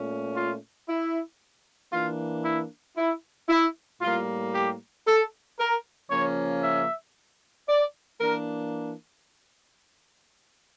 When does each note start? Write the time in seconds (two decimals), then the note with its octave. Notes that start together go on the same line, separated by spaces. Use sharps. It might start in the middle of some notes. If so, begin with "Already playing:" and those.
Already playing: A#2 A3 C#4
0.35 F4
0.88 E4
1.91 E3 A#3 D4 F4
2.43 E4
2.96 E4
3.48 E4
4.01 A2 G3 A#3 F4
4.53 G4
5.06 A4
5.58 A#4
6.10 C#3 F3 A#3 C#4 C#5
6.62 E5
7.67 D5
8.19 E3 A#3 D4 A#4